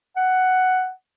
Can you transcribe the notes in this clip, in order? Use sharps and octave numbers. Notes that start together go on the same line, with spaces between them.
F#5